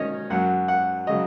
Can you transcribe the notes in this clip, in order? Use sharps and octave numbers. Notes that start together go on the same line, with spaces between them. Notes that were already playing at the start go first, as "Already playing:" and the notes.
Already playing: D#3 C#4 D#4 C#5 D#5
F#2 F#3 F#5
F#5
C#3 F#3 D#5